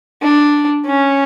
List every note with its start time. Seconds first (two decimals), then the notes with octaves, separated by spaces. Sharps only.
0.22 D4
0.86 C#4